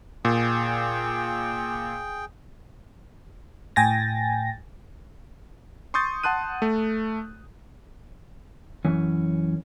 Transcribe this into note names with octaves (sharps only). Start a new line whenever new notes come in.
A#2 G#4 G5
A2 G5 G#5 A6 A#6
C6 C#6 D#6 G6 A6
F#5 A5 C6 F#6 D#7
A3
F#2 E3 C#4